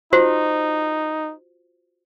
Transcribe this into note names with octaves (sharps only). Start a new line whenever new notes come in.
D#4 F4 F#4 C5